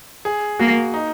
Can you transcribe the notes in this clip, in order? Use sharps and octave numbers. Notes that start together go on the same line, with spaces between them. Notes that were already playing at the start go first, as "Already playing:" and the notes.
G#4
A#3 F#4
D#4